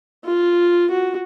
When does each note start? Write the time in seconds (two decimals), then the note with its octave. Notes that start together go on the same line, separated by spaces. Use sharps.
0.25 F4
0.91 F#4